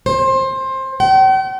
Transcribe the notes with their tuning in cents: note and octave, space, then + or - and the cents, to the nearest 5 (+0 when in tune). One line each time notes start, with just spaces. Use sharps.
C5 +20
G5 -45